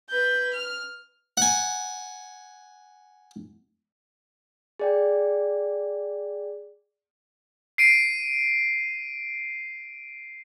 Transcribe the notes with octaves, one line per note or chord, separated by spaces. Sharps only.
B4 G6
F6
F#5 G#5
G#4 D5 G5
C7 D7 D#7